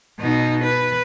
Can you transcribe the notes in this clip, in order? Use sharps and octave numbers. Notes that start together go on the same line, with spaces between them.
B2 D#4
B4